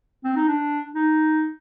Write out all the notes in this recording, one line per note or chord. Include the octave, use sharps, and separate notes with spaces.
C4
D#4
D4
D#4